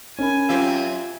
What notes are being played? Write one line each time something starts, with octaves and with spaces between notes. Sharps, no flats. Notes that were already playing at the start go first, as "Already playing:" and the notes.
C#4 A#4 G#5 B5
F#2 C4 F4 G4 E5